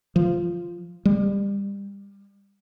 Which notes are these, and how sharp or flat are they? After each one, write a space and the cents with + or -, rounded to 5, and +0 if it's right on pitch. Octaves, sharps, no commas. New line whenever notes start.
F3 -10
G3 +30